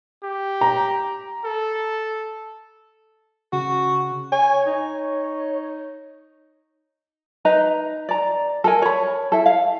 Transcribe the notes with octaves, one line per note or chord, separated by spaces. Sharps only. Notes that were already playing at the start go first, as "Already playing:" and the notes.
G4
A#5
A4
C#3 F#4
C#5 G#5
D#4
D#4 B4 A#5
D5 A#5
A4 A#4 G#5
C#5 B5
E4 A4
F5